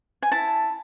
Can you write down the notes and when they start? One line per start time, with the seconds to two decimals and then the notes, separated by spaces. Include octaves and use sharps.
0.22 G#5
0.32 E4 A5